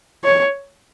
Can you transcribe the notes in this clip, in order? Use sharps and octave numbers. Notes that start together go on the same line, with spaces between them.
C#5